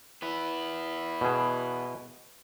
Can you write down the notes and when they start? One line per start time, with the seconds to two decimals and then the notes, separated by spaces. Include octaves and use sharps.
0.22 B3 E4
1.21 B2 G#4